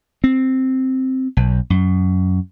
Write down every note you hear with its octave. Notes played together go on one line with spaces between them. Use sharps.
C4
B1
F#2